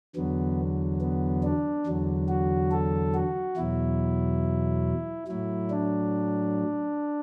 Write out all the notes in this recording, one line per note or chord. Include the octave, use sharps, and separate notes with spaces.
E2 D3 F#3 B3
B3
D4
E2 D3 F#3
F#4
A4
F#4
E2 B2 F#3 E4
A2 F#3 E4
D4